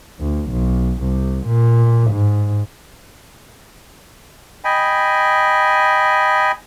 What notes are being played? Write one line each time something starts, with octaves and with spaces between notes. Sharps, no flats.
D2
B1
C2
A#2
G#2
D#5 G5 G#5 B5